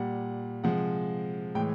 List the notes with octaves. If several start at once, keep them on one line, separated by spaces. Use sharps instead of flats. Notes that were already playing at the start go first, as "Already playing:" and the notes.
Already playing: A#2 G3 F#5
C3 F3 G#3 F#5
A2 E3 G#3 G5